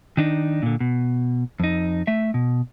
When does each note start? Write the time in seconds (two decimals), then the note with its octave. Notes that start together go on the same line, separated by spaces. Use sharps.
0.17 D#3 D4 D#4
0.63 A#2 D3
0.80 B2
1.60 F2 D#4
2.07 A3 E5
2.34 B2